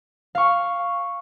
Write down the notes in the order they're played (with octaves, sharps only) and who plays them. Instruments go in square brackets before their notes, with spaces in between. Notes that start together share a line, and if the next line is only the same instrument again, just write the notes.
[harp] F5 C#6